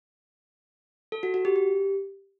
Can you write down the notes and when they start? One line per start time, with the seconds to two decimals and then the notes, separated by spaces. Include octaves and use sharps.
1.12 A4
1.23 F#4
1.34 F#4
1.45 G4
1.56 G4